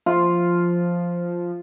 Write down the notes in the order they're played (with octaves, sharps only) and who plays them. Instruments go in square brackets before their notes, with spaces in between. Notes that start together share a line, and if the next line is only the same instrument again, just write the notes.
[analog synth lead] F3 [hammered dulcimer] F4